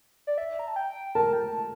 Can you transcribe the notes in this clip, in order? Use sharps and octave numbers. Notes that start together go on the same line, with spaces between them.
D5
E5
A#5
A5
G5
A#4 A5
G5
A5